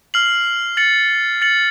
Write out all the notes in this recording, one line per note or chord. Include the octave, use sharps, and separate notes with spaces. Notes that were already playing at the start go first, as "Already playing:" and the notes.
F6 C7 F#7
A6 C#7 F#7
A6 C#7 F#7